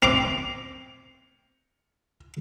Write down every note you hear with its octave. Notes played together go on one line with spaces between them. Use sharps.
C4 C6 D6 F7